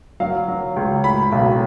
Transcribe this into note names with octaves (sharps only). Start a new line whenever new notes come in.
F#3 F5
F#3
C#2
A2 B5
B1